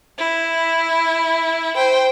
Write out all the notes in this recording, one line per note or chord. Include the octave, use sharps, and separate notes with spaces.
E4
C5 G5